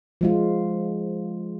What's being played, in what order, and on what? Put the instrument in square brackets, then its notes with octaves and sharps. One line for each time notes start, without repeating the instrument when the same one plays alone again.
[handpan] F3 G#3 F4